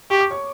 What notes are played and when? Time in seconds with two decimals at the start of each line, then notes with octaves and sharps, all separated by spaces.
0.10 G4 C#6
0.21 D6
0.30 C#5 C#6